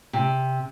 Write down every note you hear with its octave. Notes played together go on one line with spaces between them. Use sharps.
C3